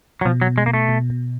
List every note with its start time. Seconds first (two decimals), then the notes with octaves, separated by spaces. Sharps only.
0.21 F#3
0.25 B2 F3
0.41 F#3
0.47 B2
0.58 G#3
0.66 B2 A#3
0.74 A3
0.89 B2
1.10 B2